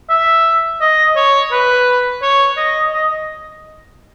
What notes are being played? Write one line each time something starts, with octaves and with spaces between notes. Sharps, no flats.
E5
D#5
C#5
B4
C#5
D#5
D#5